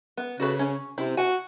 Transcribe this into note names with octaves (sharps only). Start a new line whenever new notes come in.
B3
C#3 F#4 A4 B4
C#4
C3 C4 E4
F#4 G#5